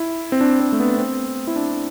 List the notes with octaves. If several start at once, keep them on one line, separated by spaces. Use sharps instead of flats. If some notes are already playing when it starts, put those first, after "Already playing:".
Already playing: E4
C4
D4
C4
A3
B3
C4
E4
D4